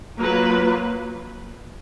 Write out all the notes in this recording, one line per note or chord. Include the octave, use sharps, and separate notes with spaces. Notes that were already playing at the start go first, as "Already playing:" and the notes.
F#3 A#3 F4 B4